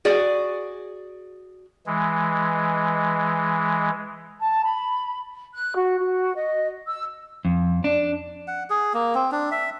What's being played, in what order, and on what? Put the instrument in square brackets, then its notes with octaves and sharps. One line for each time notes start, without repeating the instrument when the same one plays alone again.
[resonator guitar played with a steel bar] F#4 G#4 D5
[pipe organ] E3 G#3
[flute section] A5
B5
F#6
F#4
F#4
D#5
E6
[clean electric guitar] F2
D4
[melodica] F#5
G#4
A#3
C4
D4
E5